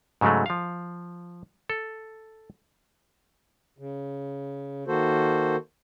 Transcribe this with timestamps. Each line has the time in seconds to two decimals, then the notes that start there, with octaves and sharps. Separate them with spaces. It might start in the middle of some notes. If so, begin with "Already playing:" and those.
0.21 G#2 C#3 F#3 G#3 A3
0.46 F3 F5
1.70 A4
3.78 C#3
4.87 D#3 A#3 F#4 A4 C5